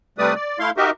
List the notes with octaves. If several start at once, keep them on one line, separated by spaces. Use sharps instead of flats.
C3 G3 A3 B4 D5 D#6
D5
A3 E4 F5 C6
D#4 F#4 G4 A#4 D#5 E5